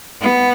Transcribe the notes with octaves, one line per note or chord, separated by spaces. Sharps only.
B3